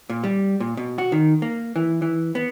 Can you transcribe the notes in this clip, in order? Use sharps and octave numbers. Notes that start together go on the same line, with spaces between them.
A#2
G3
A#2
B2
F#4
D#3
A#3
E3
E3
B3